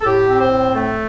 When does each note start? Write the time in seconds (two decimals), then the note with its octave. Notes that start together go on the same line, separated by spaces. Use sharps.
0.01 A4
0.05 A2 G4
0.28 C4
0.39 C5
0.50 A2
0.73 A3 A4